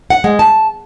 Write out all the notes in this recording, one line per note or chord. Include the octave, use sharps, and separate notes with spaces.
F#5
G#3
A5